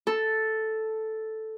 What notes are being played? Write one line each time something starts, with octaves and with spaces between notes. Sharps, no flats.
A4